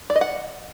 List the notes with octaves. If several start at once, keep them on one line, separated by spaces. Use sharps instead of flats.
D5
D#5
F#5